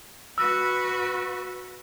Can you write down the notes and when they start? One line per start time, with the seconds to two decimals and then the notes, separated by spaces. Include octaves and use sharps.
0.38 F#4 B4 E6